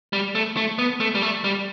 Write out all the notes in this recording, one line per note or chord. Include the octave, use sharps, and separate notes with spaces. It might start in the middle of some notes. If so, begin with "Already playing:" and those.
G3
A3
A3
B3
A3
G3
A3
G3